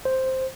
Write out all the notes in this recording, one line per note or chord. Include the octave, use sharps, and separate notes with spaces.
C5